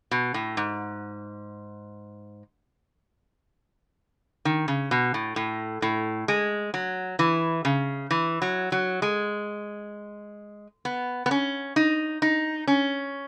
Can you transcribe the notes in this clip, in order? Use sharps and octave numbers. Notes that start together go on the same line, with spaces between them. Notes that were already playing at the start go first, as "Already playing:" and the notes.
B2
A2
G#2
D#3
C#3
B2
A2
A2
A2
G#3
F#3
E3
C#3
E3
F#3
F#3
G#3
B3
B3
C#4
D#4
D#4
C#4